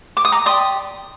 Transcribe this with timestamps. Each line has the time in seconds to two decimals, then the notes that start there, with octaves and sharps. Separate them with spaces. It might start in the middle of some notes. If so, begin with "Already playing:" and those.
0.17 D6
0.25 D#6
0.32 A#5 D6
0.46 G4 D5 C6 D#6